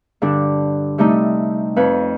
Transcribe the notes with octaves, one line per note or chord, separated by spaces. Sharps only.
G2 D3 D4
C3 G3 A3 D#4
F2 B4 C#5